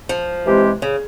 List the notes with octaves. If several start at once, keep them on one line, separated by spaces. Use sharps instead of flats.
F3
C3 E3 G#3 C4 G4
C#3